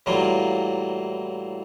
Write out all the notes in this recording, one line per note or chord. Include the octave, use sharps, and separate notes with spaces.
A2 E3 F#3 G3 A#3 F4